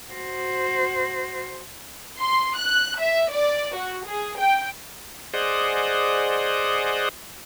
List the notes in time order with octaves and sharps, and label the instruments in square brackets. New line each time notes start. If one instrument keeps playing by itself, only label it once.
[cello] F#4 C5
[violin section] C6
F#6
E5
D5
F#4
G#4
G5
[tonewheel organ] G#4 C5 D5 D#5 F#5